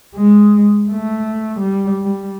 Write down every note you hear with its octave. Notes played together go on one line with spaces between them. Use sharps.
G#3
A3
G3
G3